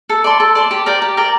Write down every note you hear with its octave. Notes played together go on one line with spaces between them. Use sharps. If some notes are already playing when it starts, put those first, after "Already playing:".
A4
D5 A5 C6
A4
D5 A5 C6
G4
A#4 D5 G5
G4
A#4 D5 G5